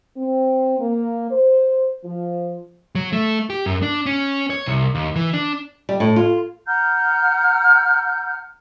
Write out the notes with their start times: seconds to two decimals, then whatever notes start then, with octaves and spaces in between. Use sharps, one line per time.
0.16 C4
0.80 A#3
1.31 C5
2.04 F3
2.95 F#3
3.13 A3
3.50 G4
3.66 F#2
3.82 D4
4.06 C#4
4.50 C#5
4.66 C2
4.95 D#2
5.16 E3
5.33 D4
5.89 G3
6.00 A2
6.16 F4
6.67 F#5 A#5 F6 G6